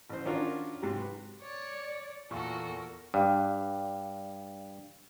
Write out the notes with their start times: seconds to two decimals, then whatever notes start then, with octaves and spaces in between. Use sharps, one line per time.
0.10 A1 C5
0.25 D#3 C#4 D4 F4 F#4 A#4
0.82 G#2 C3 F#3
0.99 B4
1.42 C#5 D5
2.31 E2 A#2 F4 F#4 A4 A#4 C#6
3.14 G2 D5 F5